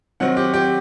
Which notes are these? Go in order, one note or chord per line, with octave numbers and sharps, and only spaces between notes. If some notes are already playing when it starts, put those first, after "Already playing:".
D#3 F#3 C4 F#5
G4
G4